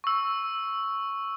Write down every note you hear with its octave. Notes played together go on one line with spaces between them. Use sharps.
C#6 E6